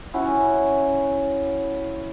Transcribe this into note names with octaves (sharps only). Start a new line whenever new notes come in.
C#4 E4 F#4